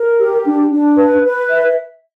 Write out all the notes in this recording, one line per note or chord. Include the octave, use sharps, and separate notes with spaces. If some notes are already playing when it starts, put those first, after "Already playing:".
Already playing: A#4
G4
D4
D4
B4
B4
E5